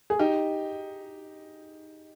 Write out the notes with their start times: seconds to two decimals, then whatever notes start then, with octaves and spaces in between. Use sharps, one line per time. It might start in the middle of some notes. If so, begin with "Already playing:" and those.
0.10 G#4
0.19 D#4 G4